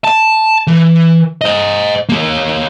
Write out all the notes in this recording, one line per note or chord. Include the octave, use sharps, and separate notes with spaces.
A5
E3
C5 D#5
A#3 G4